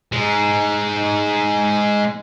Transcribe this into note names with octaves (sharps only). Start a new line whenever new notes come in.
G#3 D#4